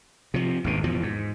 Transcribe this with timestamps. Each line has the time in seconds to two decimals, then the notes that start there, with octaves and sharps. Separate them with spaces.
0.34 C3 F3
0.64 G#1 D2 B2
0.84 E2 B2 F3
1.03 G#2